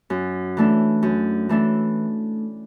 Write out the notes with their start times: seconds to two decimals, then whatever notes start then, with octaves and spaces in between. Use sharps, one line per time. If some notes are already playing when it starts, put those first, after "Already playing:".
0.10 F#2
0.57 E3 A3 D4
1.03 F#2
1.49 E3 A3 D4